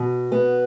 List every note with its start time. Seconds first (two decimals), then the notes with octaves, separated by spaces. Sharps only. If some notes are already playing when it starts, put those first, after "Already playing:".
Already playing: B2
0.32 B3